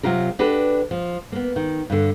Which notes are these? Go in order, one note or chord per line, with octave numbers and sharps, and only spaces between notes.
C3 F#3 F4 G4 A#4
D4 F#4 G4 A4 B4
F3
A#3 B3
D#3
G2 D3